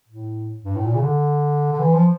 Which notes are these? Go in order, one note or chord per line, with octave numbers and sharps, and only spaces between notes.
A2
G2
A2
A#2
C#3
D3
D3
E3
F3